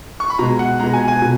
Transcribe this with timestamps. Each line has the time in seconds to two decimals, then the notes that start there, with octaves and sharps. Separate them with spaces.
0.20 C#6
0.30 B5
0.39 B2 G#3 A#5
0.59 F#5
0.80 B2 G#3 A#5
0.93 G#5
1.08 G#5
1.22 B2